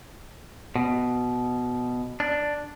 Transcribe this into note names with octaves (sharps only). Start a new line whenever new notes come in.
B2
D4